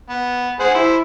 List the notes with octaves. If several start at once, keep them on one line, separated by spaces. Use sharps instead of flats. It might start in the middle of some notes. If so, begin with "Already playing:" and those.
B3
G#4 C5 F#5
E4 C5